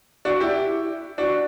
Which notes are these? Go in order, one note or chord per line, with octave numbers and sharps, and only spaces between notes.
D4 F#4
E4 G4
D4 F#4